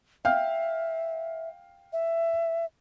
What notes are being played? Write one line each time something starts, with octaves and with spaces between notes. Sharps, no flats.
E5 F5 G5 F6
E5